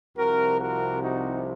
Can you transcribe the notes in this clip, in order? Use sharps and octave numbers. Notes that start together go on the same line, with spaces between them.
C2 C3 F3 F#4 A#4
F#4 A#4
D#4 F#4